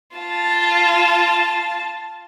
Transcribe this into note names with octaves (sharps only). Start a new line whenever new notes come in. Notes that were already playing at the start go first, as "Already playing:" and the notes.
F4 A5